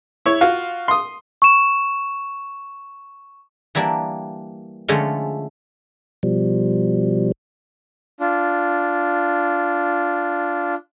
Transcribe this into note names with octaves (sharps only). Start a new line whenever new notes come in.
E4 C#5
F4 F#4 F5
C6 D#6
C#6 E7
E3 G3 A#3 D4
D3 F3 G#3 A3 C#4
B2 F3 G3
D4 F4